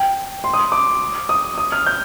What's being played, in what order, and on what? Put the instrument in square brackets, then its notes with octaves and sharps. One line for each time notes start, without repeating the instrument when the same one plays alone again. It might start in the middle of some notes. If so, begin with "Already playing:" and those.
Already playing: [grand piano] G5
C6
D#6
D6
D#6
D#6
F6
G6